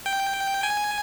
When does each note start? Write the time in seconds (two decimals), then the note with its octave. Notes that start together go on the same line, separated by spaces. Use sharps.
0.06 G5
0.63 G#5